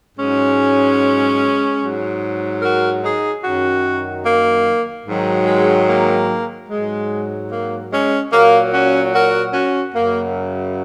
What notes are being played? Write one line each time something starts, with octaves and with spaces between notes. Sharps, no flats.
G#2 F#3 G#3 C#4
G#2 F#3
F#4 A#4
D#4 G#4
F#2 D#3 F#3 C#4 F#4
A#3
G#2 D#3 F#3
G#3
A#3
G#2 F#3 G#3
A#3
G#3 C#4
A#2 F#3 A#3
C#4 F#4
F#4 A#4
C#4 F#4
F#2 C#3 F#3 A#3